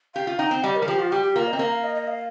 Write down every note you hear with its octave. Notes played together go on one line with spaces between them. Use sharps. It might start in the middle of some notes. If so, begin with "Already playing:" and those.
G4 F5
F4
D#4 G5
C4
G3 D#5
A#4
G3
F3 G4
F4
G3 G4
G4
A#3 F4
D#5
C4
A#3 F5
F5
D#5
D#5
F5